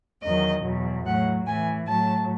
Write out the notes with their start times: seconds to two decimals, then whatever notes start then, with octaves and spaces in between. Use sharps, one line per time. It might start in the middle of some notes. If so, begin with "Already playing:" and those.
0.22 E2 D#3 F#3 D#5
0.64 E2 B2 F#3
1.05 A2 F#3 F#5
1.46 A2 E3 G#5
1.87 A2 F#3 A5